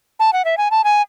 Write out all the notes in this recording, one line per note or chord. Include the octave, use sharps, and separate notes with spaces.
A5
F#5
E5
G#5
A5
G#5